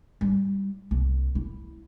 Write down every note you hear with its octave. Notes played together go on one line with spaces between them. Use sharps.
G3 E4
C2
E4